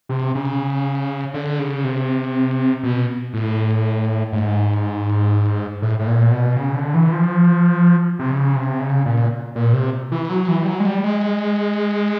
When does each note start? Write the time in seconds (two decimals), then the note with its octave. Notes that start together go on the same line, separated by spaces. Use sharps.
0.09 C3
0.35 C#3
1.34 D3
1.59 C#3
1.84 C3
2.83 B2
3.34 A2
4.32 G#2
5.82 A2
5.99 A2
6.07 A#2
6.31 B2
6.56 C#3
6.75 D3
6.94 E3
7.12 F3
8.19 C3
8.31 C#3
8.56 C3
8.80 C#3
9.06 A#2
9.55 A#2
9.73 C3
10.12 E3
10.29 F#3
10.48 E3
10.63 G3
10.67 F#3
10.80 G#3
10.86 G3
11.04 G#3